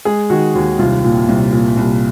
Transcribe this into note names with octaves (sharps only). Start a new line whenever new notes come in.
G#3 G#4
D#3 F#4
D#2 F#4
C2 F4
A#2
C2
A#2
C2